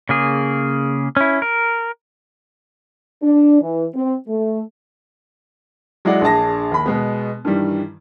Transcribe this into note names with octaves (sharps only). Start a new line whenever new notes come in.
C#3 A#3 G#4
C#4 E4
A#4
D4
E3
C4
A3
F#3 G#3 E4 D5 F#5
A#1 D4 G#4 A5 A#6
D#2 B5
B2 G#3 B3
G2 D#3 E3 G3